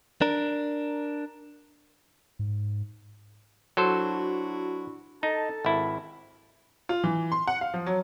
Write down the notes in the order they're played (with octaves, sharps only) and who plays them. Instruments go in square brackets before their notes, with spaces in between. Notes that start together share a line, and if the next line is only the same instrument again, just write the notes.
[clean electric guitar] D4 A#4
[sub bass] G#2
[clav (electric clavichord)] F#3 A4 C5 [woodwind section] D4 E4 F#4
[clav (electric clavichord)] D#4 [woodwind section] A4 A5
[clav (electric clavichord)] G#1 E4
[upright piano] F4
E3
C6
F#5
F5
F3
F#3